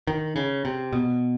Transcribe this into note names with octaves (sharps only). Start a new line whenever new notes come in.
D#3
C#3
C3
B2